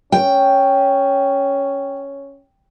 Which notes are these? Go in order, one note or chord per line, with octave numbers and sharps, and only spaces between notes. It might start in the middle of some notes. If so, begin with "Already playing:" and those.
C#4 G5